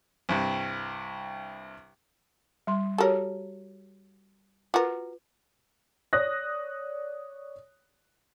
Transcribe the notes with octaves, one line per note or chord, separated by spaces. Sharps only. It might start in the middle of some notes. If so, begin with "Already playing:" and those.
C2 G2 C3
G3 C6
F#4 G4 A4 A#4 C#5
F4 F#4 A#4 B4
C#5 D5 D#6 F#6 A#6